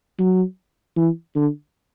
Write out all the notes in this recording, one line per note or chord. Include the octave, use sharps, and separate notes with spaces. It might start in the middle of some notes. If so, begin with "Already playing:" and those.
F#3
E3
D3